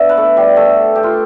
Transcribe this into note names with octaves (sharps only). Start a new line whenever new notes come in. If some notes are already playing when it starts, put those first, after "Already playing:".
Already playing: B2 B3 D4 D5 E5
B4
A3 A4
G3 G4
A3 A4
G4
F4